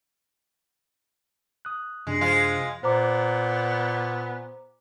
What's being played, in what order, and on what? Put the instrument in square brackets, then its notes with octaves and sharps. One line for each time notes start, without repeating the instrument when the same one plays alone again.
[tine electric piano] D#6 F#6
[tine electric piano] F#2 C3 D4 [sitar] G#3
[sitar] F3 G#3 F4
[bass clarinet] A#2 [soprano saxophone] B3 [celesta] C5 A#5 D6